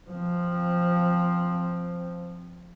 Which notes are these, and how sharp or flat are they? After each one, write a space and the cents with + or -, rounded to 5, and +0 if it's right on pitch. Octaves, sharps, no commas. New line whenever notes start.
F3 +0 C4 +0